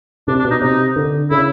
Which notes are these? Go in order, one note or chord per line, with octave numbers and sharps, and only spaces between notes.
C3 D4
D4
B2
D#4
C3 D#4
D3
C#3 E4